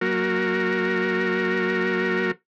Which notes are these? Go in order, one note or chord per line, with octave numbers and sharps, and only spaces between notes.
F#3 A#3 F#4 A#4